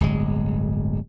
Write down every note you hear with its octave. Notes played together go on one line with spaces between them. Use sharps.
D1 G1 G#3